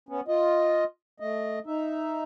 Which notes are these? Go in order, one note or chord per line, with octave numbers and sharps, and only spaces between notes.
B3 C#4
F4 D#5
A3 D#5
D#4 E5